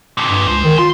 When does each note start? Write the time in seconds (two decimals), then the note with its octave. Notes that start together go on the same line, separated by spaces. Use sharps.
0.17 F2 A#2
0.29 G2
0.48 C#2 G#2 C5
0.64 D#3
0.78 F4 C6